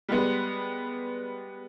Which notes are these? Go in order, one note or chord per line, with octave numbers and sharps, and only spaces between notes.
G3 G#3 B3